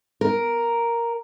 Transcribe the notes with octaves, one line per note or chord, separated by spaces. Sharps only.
A#4